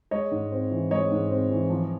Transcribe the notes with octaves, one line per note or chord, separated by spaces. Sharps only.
G#3 C#5 D#5
G#2
C4
E3
G#3 C#5 D#5
G#2
C4
E3
F3